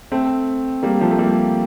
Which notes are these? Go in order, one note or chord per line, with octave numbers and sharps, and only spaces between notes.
A3 C4
G3 A#3
F3 A3
A3
G3 A#3